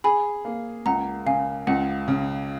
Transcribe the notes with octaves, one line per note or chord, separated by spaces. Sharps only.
G#4 G#5 B5
A#3
C#2 F#5 A#5
C#3 F5 G#5
C#2 F#5
C#3